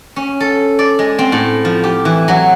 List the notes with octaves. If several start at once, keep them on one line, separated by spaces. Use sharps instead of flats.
C#4
A4
D5
G#3
C4
A2
F3
G4
E3
F#3